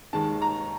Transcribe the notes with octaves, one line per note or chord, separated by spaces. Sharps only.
D#2 D#3 G#3 A5
A#5